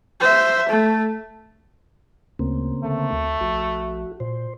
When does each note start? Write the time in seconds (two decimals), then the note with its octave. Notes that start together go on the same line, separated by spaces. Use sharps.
0.20 C5 E5
0.69 A3
2.39 D2 C#3 A#3 C4
2.83 D3 A3
3.12 D2
3.41 A#1 F#4
4.20 A#2 C5